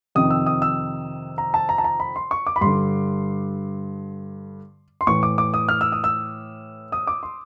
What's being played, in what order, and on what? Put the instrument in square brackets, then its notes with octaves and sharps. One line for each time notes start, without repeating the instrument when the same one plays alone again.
[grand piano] F2 C3 D#3 D#6
E6
D#6
E6
A#5
A5
A#5
A5
A#5
B5
C6
C#6
D6
B5
G2 D3 C6
C6
A2 E3 C#6
D6
D6
D#6
F6
E6
D#6
E6
D#6
D6
C6